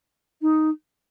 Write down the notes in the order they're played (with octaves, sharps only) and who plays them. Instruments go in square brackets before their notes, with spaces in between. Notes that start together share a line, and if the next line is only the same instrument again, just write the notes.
[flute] D#4